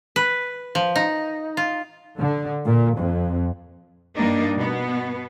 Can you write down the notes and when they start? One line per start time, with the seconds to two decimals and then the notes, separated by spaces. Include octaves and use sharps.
0.16 B4
0.75 F3
0.96 D#4
1.57 F4
2.19 D3
2.66 A#2
2.98 F2
4.16 G2 G3 A#3 D4 D#4
4.56 B2 B3